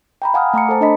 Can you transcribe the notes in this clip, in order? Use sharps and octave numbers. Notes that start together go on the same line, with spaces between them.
G5 A#5 B5
F5 F#5 G#5 D6 D#6 F6
A3 A#5 D6 C#7
A4 C5 A5
D4 A4 D#5 B5 B6